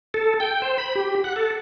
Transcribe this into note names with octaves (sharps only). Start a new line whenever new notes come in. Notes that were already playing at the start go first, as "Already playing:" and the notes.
A4
G5
C5
B5
G4
F#5
A4